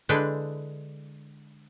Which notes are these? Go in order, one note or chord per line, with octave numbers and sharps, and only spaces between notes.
D3 G#3 D4 E4 B4 G5